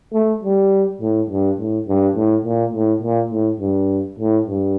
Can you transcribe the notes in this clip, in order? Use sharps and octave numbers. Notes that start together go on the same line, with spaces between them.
A3
G3
A2
G2
A2
G2
A2
A#2
A2
A#2
A2
G2
A2
G2